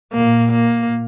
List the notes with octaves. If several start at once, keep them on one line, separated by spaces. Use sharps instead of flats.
A#2 A#3
A#3